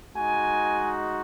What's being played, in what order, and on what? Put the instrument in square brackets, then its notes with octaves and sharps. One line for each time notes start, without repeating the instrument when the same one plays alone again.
[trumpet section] G#3 D#4 F#4 G#5